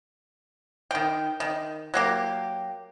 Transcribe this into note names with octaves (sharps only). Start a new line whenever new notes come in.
D#3 G5
D#3
F#3 A#3 G4